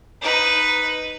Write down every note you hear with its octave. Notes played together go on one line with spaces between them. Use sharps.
D#4 B4